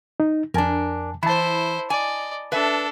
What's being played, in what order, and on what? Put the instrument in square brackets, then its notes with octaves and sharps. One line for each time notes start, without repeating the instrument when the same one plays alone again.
[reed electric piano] D#4
[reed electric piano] F2 G#5 A5 [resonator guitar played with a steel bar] D4 A#4
[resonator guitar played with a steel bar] E3 [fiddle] E4 C5 [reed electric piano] A5 B5
[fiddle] D5 D#5 [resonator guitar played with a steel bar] G#5
[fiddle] D4 A4 [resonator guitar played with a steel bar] B4 E5